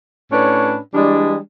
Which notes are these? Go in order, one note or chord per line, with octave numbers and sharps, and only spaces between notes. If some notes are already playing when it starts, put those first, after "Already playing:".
A2 C#4 D4 B4 C#5
E3 G3 G#3 D4